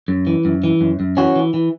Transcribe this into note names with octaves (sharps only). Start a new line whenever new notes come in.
F#2
E3
F#2
E3
F#2
F#2
E3 C#4 F#4
E3
E3